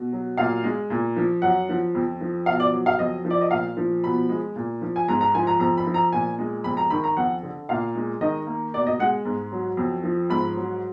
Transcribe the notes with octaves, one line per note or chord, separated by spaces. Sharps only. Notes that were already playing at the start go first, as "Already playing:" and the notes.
Already playing: B2
F#3
A#2 F5
G#3
A#2
F3
F#2 F#5
F3
F2
F3
B2 F5
D5
F#3
F5
F2 D#5
F3
D5
D#5
A#2 F5
F3
B2 B5
G#3
A#2
F3
G#5
G#2 A#5
A#5
F3 G#5
A#5
F2 A#5
B5
F3
A#5
A#2 G#5
G#3
F2 B5
A#5
D#3 B5
A#5
F2 F#5
D3
A#2 F5
G#3
D#3 D#5
A#3
B2 D5
D#5
G#3 F#5
G#2
F#3
F2
F3
G#2 B5
F#3